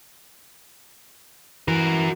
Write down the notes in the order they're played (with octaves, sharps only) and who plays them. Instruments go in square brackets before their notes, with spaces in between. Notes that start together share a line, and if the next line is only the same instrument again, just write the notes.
[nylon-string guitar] E3 [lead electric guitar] F#4 A#4